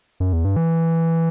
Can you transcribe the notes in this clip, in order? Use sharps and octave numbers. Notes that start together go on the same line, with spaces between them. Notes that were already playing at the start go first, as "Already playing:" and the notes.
F#2
E2
G2
E3